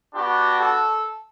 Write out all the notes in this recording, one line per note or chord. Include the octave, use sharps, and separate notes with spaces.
B3 D4 F#4 G4
A4